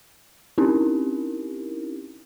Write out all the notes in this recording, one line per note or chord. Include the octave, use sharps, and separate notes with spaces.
C4 C#4 D#4 E4 G4 A#4